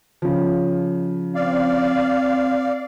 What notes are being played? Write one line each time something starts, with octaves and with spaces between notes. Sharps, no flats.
C#3 F3
C4 D5 F5